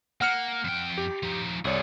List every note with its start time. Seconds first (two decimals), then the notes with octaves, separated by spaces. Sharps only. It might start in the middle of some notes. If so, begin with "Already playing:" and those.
0.21 A#3 F#5 F6 C#7
0.65 F2 G5
0.98 G4
1.23 F3 D#4
1.65 C2 G#4 A4 C#5 D5